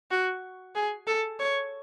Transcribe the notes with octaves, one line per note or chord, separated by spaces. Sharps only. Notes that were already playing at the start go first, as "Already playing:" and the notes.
F#4
G#4
A4
C#5